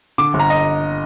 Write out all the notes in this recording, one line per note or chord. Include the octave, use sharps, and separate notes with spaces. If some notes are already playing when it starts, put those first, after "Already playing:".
D3 D6
G1
A#5
D#5